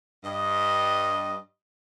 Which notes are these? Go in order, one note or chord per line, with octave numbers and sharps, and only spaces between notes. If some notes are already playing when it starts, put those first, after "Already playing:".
G2 D#5